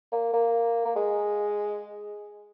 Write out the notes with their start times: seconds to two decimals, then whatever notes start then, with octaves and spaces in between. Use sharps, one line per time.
0.12 A#3
0.34 A#3
0.86 A#3
0.96 G#3